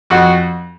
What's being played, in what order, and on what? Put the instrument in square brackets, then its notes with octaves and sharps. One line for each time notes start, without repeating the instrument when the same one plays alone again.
[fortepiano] F2 F#4